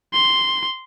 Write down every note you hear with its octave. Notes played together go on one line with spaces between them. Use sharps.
C6